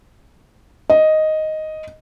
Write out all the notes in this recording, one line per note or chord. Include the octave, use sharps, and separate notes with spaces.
D#5